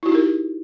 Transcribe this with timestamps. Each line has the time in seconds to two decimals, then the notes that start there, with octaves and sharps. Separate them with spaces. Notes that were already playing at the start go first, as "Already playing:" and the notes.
0.03 E4
0.06 F#4
0.09 D#4
0.12 G4
0.15 A#4